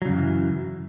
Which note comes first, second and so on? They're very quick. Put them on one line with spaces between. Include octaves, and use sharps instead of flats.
F#3 C#3 F#2 E3